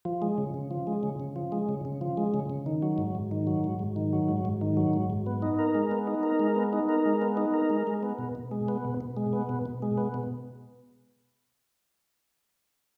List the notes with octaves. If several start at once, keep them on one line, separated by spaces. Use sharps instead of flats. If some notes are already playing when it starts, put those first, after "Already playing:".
F3
G#3
C#3
C#3
F3
G#3
C#3
C#3
F3
G#3
C#3
C#3
F3
G#3
C#3
C#3
D#3
F#3
G#2
G#2
D#3
F#3
G#2
G#2
D#3
F#3
G#2
G#2
D#3
F#3
G#2
G#2
B3
D#4
A#4
G#3
B3
D#4
A#4
G#3
B3
D#4
A#4
G#3
B3
D#4
A#4
G#3
G#3
B3
B2
B2
G#3
B3
B2
B2
G#3
B3
B2
B2
G#3
B3
B2